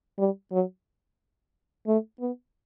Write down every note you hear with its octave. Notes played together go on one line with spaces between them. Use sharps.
G3
F#3
A3
B3